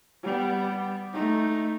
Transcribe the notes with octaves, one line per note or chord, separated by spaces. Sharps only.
G3 B3
A3 D#4